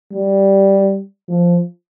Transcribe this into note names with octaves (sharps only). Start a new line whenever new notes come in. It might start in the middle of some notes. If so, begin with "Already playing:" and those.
G3
F3